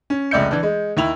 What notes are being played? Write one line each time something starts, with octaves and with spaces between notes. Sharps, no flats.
C#4
F1 C#2 D5 E5 G6 C#7
E3 D4
G#3
D#2 E4 F7